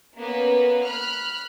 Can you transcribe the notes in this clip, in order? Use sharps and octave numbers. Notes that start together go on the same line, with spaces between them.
A#3 B3 C#4 B4
B5 F6 F#6